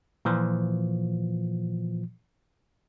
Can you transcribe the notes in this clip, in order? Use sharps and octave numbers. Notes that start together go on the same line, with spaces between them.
A#2 E3 F3